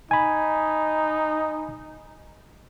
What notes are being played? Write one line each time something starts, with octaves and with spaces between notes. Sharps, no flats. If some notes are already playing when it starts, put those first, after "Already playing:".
D#4 G#5 B5